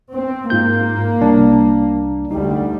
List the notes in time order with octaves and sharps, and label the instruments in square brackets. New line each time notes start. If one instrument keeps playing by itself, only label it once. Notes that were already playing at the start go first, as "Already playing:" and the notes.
[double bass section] C4
[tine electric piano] G#2 F4 G6 [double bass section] A#3
[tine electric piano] C2 D4
[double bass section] D2 G3 [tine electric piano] D#4